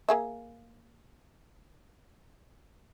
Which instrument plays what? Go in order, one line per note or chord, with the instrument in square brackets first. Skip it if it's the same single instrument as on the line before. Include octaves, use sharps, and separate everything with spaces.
[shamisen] A#3 G#4 E5